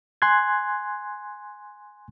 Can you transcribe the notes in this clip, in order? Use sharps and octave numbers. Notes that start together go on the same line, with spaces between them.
G#5 C6 F#6 G#6